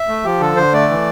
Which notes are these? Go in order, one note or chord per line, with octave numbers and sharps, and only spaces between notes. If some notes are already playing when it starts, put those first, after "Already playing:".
Already playing: E5
A3
F3 G4
D3 A4
D3 C5
A3 D5
E3